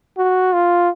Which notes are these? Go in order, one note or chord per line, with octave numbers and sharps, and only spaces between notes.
F#4
F4